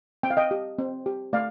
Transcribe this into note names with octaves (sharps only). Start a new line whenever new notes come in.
C4 G5
F5
D#5 G5
G4
C4
G4
A3 D5 F5